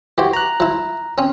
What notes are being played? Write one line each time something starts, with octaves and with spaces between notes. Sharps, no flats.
E3 F#4 G4 C5
A#5 F#6
F3 E4
C4 C#4